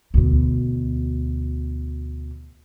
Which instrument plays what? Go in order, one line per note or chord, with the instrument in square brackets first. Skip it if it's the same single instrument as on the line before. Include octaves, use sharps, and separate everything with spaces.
[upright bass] D2 B2